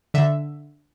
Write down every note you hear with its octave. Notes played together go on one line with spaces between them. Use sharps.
D3 E5